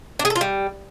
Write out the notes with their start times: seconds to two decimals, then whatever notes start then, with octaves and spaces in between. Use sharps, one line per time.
0.19 D4
0.25 G#4
0.30 A4
0.36 F4
0.41 G3